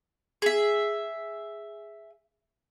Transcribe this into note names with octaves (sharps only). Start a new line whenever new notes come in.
G#4 E5